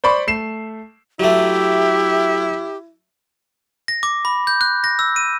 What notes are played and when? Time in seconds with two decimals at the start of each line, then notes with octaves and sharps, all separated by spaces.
0.04 C5 D5 B5 C#6
0.27 A3 C7 E7
1.20 F#3 A3 E4 G4
3.88 A#6
4.03 D6
4.25 B5
4.47 G6
4.61 F#6
4.84 A#6
4.99 E6
5.16 D#7